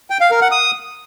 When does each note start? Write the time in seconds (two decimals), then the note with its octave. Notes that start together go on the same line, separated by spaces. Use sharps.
0.10 G5
0.21 F5
0.31 A#4
0.41 F#5
0.52 D#6